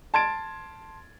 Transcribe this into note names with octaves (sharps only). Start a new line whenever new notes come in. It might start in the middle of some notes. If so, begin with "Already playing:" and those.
A5 C6 G#6 A6 D7